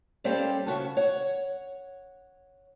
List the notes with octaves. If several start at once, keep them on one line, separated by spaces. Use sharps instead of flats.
G3 A#3 C4 C#4 G4 A4
C#3 F#4 A5
C#5 F#5